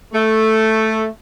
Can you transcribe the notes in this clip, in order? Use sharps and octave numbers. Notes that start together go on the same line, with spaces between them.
A3